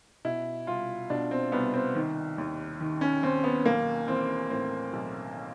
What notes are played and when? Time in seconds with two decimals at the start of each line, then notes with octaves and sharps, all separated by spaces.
0.25 B2 E4
0.67 C2 F4
1.10 B2 D4
1.31 C4
1.52 C2 B3
1.74 C4
1.95 D#3
2.38 D#2
2.81 D#3
3.01 C#4
3.23 D#2 C4
3.44 B3
3.65 B1 A#3
4.08 E3 C4
4.50 A2 C4
4.93 B1